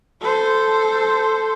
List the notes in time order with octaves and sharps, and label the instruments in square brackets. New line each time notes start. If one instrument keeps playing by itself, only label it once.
[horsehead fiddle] A4 C5